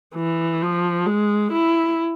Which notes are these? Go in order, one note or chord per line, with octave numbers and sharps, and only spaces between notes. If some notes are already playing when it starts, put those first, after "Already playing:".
E3
F3
G#3
E4